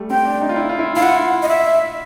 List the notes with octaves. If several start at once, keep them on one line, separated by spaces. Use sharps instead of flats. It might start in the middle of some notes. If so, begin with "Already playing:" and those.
Already playing: G3 A3
C4 G5
D4
D#4
F4
E4
F4
E4
E4 F5
F4 F#5
D#5
E5